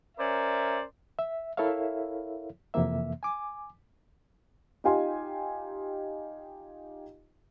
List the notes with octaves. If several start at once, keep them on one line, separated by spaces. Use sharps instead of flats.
C#4 A#4 C5 D5 E5
E5
E4 A4 A#4 C#5 E5 F5
F2 C3 E3 A#3 E5
G#5 D6
D#4 F4 G4 F5 G#5 C6